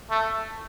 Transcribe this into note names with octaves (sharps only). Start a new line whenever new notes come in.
A3